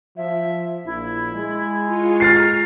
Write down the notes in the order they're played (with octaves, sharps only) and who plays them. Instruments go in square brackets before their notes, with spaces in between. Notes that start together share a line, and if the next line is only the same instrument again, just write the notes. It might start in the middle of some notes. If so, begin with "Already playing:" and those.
[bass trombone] F3 [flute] E5
[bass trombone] A#1 [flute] E4
[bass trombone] G#3
[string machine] F4 G#5 C#6
[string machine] A#5 [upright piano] F6 A6 C7